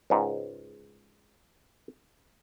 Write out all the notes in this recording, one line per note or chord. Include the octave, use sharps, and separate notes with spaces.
C#2 G#2